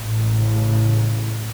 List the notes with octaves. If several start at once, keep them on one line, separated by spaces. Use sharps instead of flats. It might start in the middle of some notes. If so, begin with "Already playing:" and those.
Already playing: A1 A2
C#3